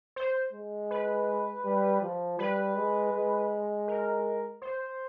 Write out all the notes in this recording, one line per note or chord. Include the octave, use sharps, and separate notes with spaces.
C5
G#3
B4
G3
F3
G3 B4
G#3
G#3
A#4
C5